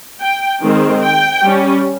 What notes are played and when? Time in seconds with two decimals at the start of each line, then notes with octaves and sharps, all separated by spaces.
0.22 G5
0.63 D#3 G#3 C4
1.04 G5
1.43 G3 C#4